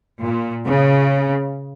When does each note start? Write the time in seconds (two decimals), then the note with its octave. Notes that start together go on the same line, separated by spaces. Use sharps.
0.23 A#2
0.68 C#3